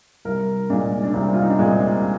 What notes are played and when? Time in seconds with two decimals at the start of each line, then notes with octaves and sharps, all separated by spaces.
0.25 C2 A#4
0.70 A#2 G#3 D4
1.03 D4
1.13 C2 C4
1.34 F4
1.42 D#4
1.50 D4
1.59 A#2 G#3 C4